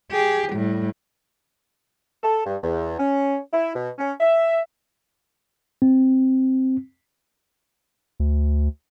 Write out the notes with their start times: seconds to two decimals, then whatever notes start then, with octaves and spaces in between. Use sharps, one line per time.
0.12 G4 G#4
0.53 A2 G3
2.23 A4
2.46 G2
2.63 E2
2.99 C#4
3.53 E4
3.75 B2
3.99 C#4
4.20 E5
5.82 C4
8.20 D2